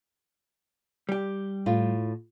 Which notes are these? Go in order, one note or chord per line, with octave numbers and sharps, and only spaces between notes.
G3 G4
A2 F4